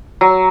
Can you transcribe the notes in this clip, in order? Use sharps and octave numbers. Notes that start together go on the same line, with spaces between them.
F#3